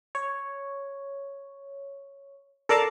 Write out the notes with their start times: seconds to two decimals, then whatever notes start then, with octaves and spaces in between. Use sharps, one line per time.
0.15 C#5
2.69 A4 A#4 D5 F5 A5